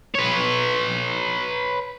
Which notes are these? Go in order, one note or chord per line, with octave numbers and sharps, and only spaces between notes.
B4 C#5